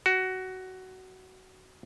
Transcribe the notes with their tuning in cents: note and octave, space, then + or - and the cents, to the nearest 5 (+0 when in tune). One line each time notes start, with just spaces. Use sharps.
F#4 +15